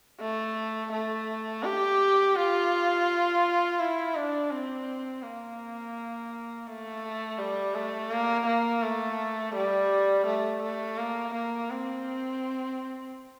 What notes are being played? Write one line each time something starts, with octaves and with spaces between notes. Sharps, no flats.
A3
A3
G4
F4
E4
D4
C4
A#3
A3
G3
A3
A#3
A#3
A3
G3
A3
A3
A#3
A#3
C4